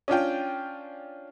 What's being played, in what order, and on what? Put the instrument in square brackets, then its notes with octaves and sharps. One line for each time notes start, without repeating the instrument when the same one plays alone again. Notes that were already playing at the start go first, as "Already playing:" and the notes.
[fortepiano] C#4 D4 F4 G5